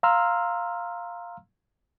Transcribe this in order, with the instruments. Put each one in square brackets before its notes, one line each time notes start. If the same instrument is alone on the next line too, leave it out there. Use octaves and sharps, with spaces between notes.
[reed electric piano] F5 A#5 C6 E6 F6